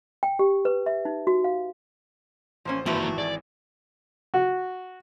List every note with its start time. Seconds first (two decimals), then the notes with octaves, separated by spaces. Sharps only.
0.23 G5
0.39 G4
0.65 B4
0.86 E5
1.05 D#4
1.27 F#4
1.44 F5
2.65 A1 F3 A#3 C#4 C5
2.86 G#1 E3 F3 A3 A#3 F#4 G4 B4
3.03 F#3
3.18 G#4 D5
4.34 F#4